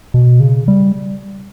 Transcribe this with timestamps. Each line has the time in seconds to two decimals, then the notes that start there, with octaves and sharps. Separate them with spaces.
0.14 B2
0.40 C#3
0.68 G3